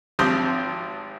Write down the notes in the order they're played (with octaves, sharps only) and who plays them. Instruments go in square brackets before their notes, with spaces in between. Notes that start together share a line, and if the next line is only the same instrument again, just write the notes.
[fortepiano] G#1 F3 C4 G4 C5 D#6